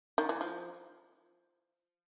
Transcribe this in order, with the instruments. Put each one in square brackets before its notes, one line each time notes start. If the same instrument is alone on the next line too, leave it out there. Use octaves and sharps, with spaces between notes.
[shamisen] D#3
E3
F3